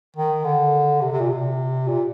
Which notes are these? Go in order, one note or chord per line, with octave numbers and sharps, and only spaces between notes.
D#3
D3
C3
C3
A#2
C3
A#2